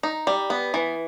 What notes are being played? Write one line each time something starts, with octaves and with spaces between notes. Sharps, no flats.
D#4
G3
B3
E3